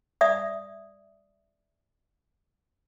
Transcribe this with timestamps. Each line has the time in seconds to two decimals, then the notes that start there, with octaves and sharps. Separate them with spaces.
0.21 D5 E5 D#6